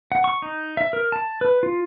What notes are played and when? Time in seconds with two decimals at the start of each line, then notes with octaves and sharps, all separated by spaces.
0.12 F#5
0.24 C#6
0.42 D#4
0.77 E5
0.93 A#4
1.12 A5
1.41 B4
1.63 F4